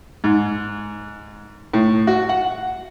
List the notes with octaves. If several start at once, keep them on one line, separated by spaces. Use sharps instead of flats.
G#2
A2
F#4
F#5